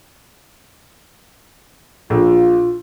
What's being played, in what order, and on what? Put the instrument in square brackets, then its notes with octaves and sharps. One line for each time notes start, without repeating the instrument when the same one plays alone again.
[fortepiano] A#1 [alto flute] F4